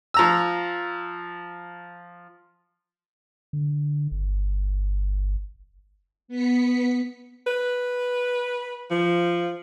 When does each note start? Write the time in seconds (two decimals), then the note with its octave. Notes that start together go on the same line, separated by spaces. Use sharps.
0.14 F3 A#5 E6
3.53 D3
4.11 G1
6.28 B3 B6 C#7
7.47 B4
8.91 F3